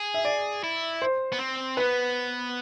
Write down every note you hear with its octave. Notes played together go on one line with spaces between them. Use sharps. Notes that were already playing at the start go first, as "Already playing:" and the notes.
Already playing: G#4
E5
D5
E4
C5
B3
C4
B3 B4